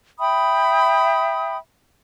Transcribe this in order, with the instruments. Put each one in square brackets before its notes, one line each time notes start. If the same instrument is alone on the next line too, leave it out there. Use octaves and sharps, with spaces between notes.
[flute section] E5 G5 B5 D#6